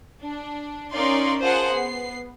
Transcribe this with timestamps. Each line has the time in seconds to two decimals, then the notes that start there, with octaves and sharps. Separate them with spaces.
0.22 D4
0.93 C#4 D#4 A#4 D5 F5 C6
1.40 F4 G#4 A#4 C5 F#5 A5
1.72 B3 C7